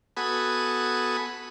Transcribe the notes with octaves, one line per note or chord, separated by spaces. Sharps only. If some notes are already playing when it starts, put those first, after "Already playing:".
B3 F#4 A4 G#5 B5 D#6